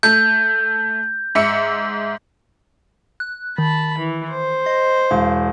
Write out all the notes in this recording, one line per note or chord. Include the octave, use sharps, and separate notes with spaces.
A3 G6
G#2 E5 C#7
F#6
D#3 A5 B5
E3
C5
D#5
E1 F5